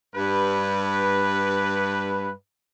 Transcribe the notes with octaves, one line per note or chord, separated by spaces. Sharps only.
G2 B4